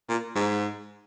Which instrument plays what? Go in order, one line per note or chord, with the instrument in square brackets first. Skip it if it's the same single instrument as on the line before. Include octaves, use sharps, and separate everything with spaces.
[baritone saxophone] A#2
G#2